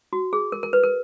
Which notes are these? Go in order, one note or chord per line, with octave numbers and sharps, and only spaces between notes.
F#4
G#4
A#4
A#4
B4
A#4